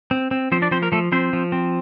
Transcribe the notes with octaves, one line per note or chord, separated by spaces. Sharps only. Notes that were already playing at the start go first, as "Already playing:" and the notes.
C4
C4
F3 C4 C5
D4 D5
F3 C4 C5
A#3 A#4
F3 A3 A4
F3 C4 C5
F3
C4